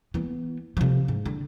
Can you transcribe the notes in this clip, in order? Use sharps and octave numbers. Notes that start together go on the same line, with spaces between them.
E3 B3
C3 F3
G#2
D3